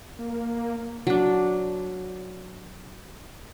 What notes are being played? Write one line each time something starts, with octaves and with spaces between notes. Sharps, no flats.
A#3
F#3 D4